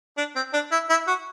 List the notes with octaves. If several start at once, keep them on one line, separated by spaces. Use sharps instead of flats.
D4
C4
D4
E4
E4
F#4